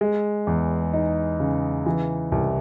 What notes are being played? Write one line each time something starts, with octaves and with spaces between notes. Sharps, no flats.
G#3
E2
D#4
C#3
E3
C2